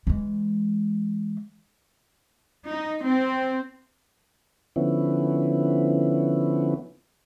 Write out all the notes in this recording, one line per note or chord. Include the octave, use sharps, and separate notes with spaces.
E3 G#3
D#4
C4
D3 F3 B3 C#4 E4